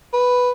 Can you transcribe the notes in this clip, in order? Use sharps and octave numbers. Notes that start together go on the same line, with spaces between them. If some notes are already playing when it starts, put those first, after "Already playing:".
B4